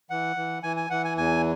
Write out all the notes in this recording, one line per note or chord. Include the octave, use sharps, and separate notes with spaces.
E3 F#5
E3
E3 G#5
G#5
E3 F#5
G#5
E2 G#5